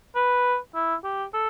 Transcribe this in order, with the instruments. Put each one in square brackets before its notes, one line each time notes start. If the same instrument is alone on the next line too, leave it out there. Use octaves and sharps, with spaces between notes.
[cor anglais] B4
E4
G4
A4